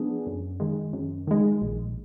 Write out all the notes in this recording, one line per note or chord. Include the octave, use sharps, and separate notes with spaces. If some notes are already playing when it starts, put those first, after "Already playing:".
Already playing: F3 B3 D4 G#4
F#2
D#3 G#3
F#2
D#3 G#3
A#1